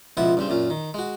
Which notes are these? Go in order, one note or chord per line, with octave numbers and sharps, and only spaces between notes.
C#2 B2 F3 E4 F#5 D#6
G2 C#3 C4
F#2 A#2 C#4
D#3
G#3 F#4